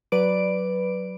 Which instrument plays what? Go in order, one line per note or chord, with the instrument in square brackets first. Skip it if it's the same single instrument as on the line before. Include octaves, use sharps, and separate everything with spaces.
[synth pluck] F#3 B4 D5 D7